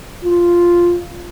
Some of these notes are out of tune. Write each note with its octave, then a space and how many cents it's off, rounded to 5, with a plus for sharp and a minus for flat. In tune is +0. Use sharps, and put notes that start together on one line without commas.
F4 -5